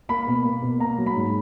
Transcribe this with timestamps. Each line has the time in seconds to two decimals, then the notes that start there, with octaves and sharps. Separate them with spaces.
0.09 A#3 B5
0.27 B2
0.44 A#3
0.62 B2
0.80 A#3 A#5
0.98 F#3
1.06 B5
1.15 G#2